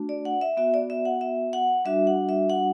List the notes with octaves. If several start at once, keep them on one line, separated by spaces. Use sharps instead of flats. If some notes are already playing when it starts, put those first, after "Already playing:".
Already playing: A3 D4 F#4
D5
F#5
E5
B3 F#4 E5
D5
E5
F#5
E5
F#5
G3 D4 F#4 E5
F#5
E5
F#5